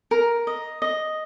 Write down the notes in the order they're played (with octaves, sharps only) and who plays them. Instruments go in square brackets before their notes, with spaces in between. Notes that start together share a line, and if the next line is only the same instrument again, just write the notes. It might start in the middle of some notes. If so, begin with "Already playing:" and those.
[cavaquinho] A#4
D#5
D#5